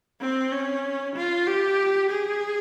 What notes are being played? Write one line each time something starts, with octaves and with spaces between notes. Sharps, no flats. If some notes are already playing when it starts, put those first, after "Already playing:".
C4
C#4
F4
G4
G#4